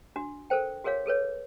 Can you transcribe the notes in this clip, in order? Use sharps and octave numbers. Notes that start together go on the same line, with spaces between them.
D4 F#4
A4 A#4 C5 G5
F#4 G#4 A#4 C#5 F5
G#4 A4 B4 C#5